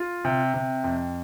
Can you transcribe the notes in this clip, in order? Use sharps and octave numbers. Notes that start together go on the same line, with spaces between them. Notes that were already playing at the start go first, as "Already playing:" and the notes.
Already playing: F4
C3
C3
F2